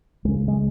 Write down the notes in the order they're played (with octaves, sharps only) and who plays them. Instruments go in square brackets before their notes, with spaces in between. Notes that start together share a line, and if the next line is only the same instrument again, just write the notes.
[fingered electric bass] C#2 C#3 G#3
G#3